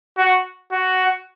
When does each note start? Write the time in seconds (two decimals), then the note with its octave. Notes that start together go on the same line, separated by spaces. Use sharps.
0.18 F#4
0.72 F#4